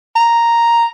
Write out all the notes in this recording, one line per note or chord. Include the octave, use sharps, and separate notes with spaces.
A#5